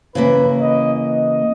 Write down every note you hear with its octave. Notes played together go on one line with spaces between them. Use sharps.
C#3 E3 A#3 B4
D#5
D#5